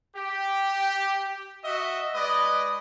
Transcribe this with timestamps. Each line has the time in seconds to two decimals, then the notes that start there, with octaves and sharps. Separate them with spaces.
0.16 G4
1.64 F#4 D#5 E5
2.15 G#3 B4 D5 D#5